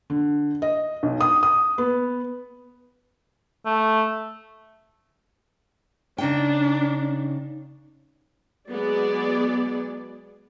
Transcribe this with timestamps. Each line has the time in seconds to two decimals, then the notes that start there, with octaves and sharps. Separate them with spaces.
0.10 D3
0.62 D#5
1.03 B1
1.21 D#6
1.43 D#6
1.78 B3
3.66 A3
6.18 C#3 D4 D#4 G5
8.69 F#3 G#3 B3 G#4 D5